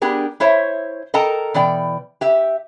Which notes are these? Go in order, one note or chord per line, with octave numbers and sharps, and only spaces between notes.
B3 D4 G4 G#4 A#4
E4 C5 C#5 E5
A4 A#4 D#5 G5 A5 A#5
B2 E3 D5 G5
G4 E5